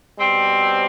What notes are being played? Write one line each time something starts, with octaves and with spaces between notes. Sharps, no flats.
B2 G3 C4